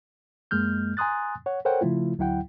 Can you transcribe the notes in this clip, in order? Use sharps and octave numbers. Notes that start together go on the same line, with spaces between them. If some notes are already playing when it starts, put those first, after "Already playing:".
F#2 G#3 A#3 F6 G6
G#5 A#5 C6 D#6 F#6 A6
C#5 F#5
A4 A#4 C5 C#5 F#5 G5
C#3 F3 A3 E4 F4
D2 F#3 E4 F#5 G5